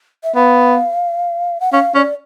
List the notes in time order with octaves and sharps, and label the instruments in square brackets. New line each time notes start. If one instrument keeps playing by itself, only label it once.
[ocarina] E5
[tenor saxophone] B3 [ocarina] F5
[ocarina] F#5
[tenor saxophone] C#4 [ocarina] F5
[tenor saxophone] C#4 [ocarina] D5